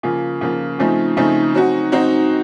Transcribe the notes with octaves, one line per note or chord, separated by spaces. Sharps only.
C#3 F3 A#3 F4
C#3 F3 A#3 F4
C#3 F3 A3 C4 D#4
C#3 F3 A3 C4 D#4
F#3 C4 D#4 F#4
F#3 C4 D#4 F#4